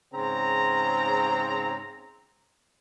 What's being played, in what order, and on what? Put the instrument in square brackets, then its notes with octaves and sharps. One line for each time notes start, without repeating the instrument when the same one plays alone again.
[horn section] G#2 C#3 C4 A#5